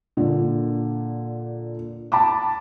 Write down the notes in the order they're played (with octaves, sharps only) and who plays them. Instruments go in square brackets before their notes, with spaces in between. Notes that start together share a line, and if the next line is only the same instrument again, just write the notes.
[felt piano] A#2 D3
A5 B5 D6